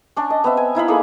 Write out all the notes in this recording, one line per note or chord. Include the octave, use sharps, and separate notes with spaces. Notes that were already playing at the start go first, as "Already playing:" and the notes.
C#4 D4 A5
D#5
B3 C4 E5
G#5
D#4 E4 F5 B5
A#3 D#4 G#4 A4